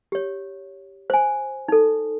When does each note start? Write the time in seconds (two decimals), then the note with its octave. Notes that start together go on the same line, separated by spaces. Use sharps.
0.12 G4 C#5
1.10 C5 G#5
1.68 D#4 A4